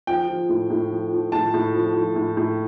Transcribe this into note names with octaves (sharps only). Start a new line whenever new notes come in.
F3 G5
F3
A2
A2
F3
F3
A2 A5
A2
F3
F3
A2
A2